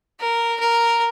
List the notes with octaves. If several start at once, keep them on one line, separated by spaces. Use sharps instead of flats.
A#4
A#4